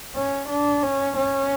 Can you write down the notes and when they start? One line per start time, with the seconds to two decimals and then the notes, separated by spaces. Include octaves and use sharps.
0.15 C#4
0.49 D4
0.83 C#4
1.17 C#4